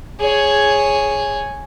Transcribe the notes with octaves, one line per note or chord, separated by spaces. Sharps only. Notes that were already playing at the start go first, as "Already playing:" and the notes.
G#4 C#5